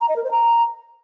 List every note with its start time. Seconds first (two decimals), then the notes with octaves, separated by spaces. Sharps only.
0.01 A#5
0.09 D#5
0.16 A#4
0.24 C5
0.31 A#5